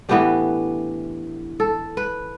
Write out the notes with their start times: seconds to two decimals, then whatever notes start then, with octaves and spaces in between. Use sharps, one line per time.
0.09 A2 E3 B3 D4 G4
1.60 A4
1.97 B4